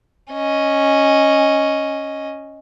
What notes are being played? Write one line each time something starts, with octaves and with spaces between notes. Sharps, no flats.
C#4 D#5